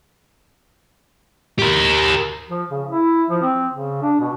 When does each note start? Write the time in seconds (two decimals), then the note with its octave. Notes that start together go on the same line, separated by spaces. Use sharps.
1.59 G4 A#4
2.50 F3
2.71 C#3
2.89 E4
3.30 F3
3.42 C4
3.73 C#3
4.03 D4
4.20 B2